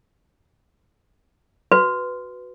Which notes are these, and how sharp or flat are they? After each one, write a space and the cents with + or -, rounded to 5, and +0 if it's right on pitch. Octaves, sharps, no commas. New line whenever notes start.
F#4 +0 B4 +5